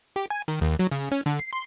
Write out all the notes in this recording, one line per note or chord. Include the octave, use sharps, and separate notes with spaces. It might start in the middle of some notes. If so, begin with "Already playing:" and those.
G4
G#5
D#3
D#2
F#3
C#3
C#4
D3
C7
C6